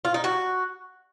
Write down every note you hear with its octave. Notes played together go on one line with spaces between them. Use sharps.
F4
D#4
F#4